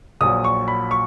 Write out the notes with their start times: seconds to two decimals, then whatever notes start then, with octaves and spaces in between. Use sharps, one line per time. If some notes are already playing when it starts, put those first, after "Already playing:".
0.21 A#1 A#2 F#3 D#6
0.44 C#6
0.68 B5
0.91 C#6